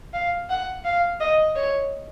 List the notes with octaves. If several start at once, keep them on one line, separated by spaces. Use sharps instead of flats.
F5
F#5
F5
D#5
C#5